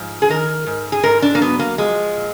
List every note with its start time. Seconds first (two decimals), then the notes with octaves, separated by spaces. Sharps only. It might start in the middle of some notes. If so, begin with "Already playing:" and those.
Already playing: G#2 F3
0.22 G#4
0.29 D#3 A#4
0.66 G#2
0.92 G#4
1.03 G#2 A#4
1.22 D4
1.35 A#3
1.41 F#3 B3
1.59 A#3
1.78 F3 G#3
2.16 A#2